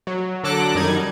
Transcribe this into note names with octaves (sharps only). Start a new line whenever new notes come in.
F#3
D3 F#3 A4 D6 F#6 A#6
F#2 D#3 G3 D#4 G#6